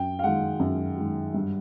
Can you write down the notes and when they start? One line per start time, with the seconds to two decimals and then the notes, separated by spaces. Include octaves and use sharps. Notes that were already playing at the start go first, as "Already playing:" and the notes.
Already playing: F#2 G5
0.19 F5
0.23 D#3 G#3 F#5
0.59 F#2
0.97 D#3 G#3
1.34 G2